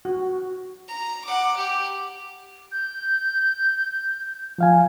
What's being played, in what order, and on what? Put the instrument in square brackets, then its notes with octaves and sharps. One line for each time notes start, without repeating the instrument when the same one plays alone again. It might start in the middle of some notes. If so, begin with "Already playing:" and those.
[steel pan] F#4
[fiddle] A#5
F#5 D6
G4
[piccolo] G6
[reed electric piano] F3 F5 G#5